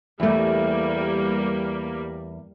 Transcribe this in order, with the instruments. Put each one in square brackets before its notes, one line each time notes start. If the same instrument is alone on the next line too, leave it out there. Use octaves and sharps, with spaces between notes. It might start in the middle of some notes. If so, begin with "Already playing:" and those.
[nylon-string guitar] E2 A3 [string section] G3 A#3